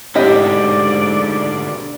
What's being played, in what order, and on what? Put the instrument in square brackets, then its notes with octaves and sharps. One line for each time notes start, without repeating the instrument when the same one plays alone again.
[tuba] G#2 [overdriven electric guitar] B2 D3 [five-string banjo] E4 G4 D#5 [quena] D5